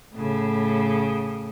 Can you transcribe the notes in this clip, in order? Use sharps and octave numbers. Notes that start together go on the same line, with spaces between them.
A2 C#3